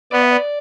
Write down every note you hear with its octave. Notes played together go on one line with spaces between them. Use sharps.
B3 D5
E5
D5